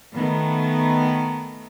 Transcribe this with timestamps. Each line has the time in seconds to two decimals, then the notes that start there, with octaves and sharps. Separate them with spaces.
0.15 D#3 A3 B3